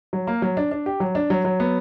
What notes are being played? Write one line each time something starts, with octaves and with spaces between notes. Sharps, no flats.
F#3
A#3
F#3
D4
D4
G4
F#3
D4
F#3
F#3
B3